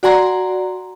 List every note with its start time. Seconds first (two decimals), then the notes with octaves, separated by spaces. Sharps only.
0.03 F#4 D5 F#5 G#5 A#5 C6